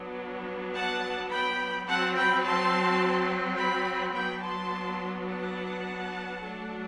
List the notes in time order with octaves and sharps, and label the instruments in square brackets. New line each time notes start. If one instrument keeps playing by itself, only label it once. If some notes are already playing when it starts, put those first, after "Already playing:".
Already playing: [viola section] F#3 B3 D4
F#5 A5
G5 B5
F#3 C4 F#5 A5
G5 B5
A5 C6
G5 B5
F#3 B3 D4 G5 B5
A5 C6
F#5 A5
F#3 A3 D4